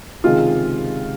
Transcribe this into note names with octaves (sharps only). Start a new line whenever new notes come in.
C#2 C3 D#3 G#3 F4